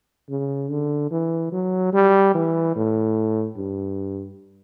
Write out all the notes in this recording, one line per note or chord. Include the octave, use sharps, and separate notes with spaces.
C#3
D3
E3
F#3
G3
E3
A2
G2